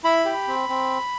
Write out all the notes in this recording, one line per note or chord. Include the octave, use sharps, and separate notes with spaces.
E4 B5
G4
C4
C4